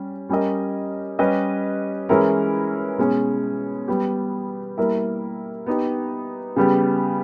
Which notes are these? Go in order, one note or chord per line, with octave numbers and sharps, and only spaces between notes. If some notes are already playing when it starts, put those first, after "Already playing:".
Already playing: G3 C#4
G3 C#4 G4 A#4 D#5
G3 C#4 G4 B4 D#5
E3 G#3 C#4 E4 A#4
B2 G#3 C#4
G3 B3 G4
G3 A#3 E4 A#4
B3 D#4 G4
C#3 G3 B3 G4